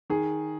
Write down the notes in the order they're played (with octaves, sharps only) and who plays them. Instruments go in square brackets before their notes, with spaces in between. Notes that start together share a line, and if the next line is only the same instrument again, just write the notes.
[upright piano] D#3 G#4